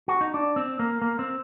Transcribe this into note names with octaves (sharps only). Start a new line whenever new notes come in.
F#4
D#4
D4
C4
A#3
A#3
C4